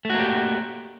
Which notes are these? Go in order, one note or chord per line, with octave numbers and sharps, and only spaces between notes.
A3 A#3 F#4 G4